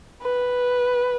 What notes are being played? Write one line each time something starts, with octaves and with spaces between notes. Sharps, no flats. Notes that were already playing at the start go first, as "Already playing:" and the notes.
B4